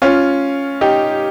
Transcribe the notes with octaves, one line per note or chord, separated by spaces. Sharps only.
C#4 F4
D#4 G4